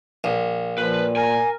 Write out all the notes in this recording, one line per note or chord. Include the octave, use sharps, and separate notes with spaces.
A#1
A#2 F3 B4
A#4 G#5